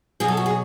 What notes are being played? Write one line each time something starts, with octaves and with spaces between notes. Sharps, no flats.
B2 F#3 G#4
A4
F#4
G#4